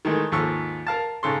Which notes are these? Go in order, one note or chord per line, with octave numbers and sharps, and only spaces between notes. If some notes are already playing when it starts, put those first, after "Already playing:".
D#3 E3 G#3 A3
D#2 G#2 F3 A4 C#6 E6
A#4 F5 A5
G#2 C#3 A4 C6